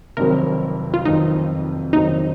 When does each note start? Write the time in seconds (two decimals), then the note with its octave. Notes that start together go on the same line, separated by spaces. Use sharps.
0.17 F1 F2 D#3 F#3 C4 A#4
0.94 F4
1.05 F1 F2 D#3 F#3 C4 D#4
1.93 F1 F2 D#3 F#3 C4 D#4